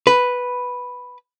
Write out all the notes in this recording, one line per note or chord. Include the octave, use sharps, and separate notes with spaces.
B4